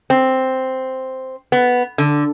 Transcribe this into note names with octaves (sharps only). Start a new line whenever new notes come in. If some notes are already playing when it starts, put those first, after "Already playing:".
C4
B3
D3